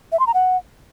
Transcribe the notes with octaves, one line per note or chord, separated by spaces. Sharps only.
E5
C6
A#5
F#5